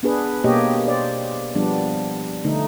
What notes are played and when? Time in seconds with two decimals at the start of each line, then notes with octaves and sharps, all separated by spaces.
0.03 B3 D4 G#4 B4
0.44 B2 A#3 G4 C#5 D#5
0.88 C5 D5
1.55 F3 G3 B3 D4
2.44 D3 A3 D#4